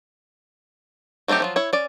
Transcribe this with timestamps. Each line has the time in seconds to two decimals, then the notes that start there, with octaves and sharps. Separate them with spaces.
1.28 F#3 A3 C4 D#4 G4
1.40 F3 F#3 F4
1.56 E4 C#5
1.73 C#4 D5